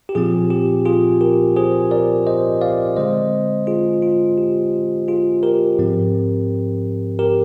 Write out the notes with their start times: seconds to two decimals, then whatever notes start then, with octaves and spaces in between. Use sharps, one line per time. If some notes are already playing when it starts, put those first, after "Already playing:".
0.09 G4
0.15 A#2 F3 C4 F4 G#4
0.50 G4
0.85 F4 G#4
1.21 G4 A#4
1.56 G#4 C5
1.91 A#4 D5
2.27 C5 D#5
2.61 D5 F5
2.96 D3 G#3 C4 C5 D#5
3.67 F4 G#4
4.02 F4
4.38 G4
5.08 F4 G#4
5.43 G4 A#4
5.79 G#2 F3 C4
7.19 G4 A#4